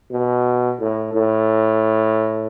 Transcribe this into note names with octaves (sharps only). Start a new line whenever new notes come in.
B2
A2
A2